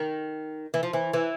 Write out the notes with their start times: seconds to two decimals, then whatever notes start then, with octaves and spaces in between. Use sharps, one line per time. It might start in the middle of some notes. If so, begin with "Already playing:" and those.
Already playing: D#3
0.74 E3
0.83 F3
0.93 E3
1.13 E3